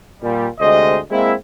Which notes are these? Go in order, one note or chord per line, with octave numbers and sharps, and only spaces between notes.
A#2 G3
D2 C3 G#3 C5 D#5
G#3 A#3 C4 E4